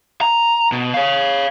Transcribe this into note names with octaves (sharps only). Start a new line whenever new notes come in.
A#5
B2
C#5 F5